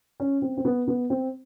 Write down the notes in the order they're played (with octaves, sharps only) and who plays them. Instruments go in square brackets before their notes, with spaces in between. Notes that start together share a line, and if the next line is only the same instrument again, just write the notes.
[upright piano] C#4
C4
C4
B3
B3
C4